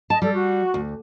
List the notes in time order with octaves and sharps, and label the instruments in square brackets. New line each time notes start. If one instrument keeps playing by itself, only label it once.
[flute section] D#5 [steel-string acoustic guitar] A5
[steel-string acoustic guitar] G3 [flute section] A4 D5
[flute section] F#4
[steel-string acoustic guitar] D2